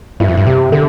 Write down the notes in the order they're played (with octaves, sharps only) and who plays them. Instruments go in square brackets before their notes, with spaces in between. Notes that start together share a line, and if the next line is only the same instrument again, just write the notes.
[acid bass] G2 [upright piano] E4
[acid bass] F2
G2
[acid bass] C3 [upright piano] G4
[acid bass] D3 [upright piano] A4